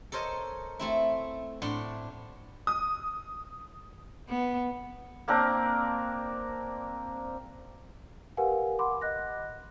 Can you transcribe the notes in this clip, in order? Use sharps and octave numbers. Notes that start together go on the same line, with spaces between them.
A4 A#4 C5 C#5 D#5
A3 C4 E4
A2 D4 F#5 C6
D#6
B3
A#3 C4 D4 A#4
G4 A#4 B4 F5 F#5 G#5
F#5 B5 C6 D6
D#5 F#6 A#6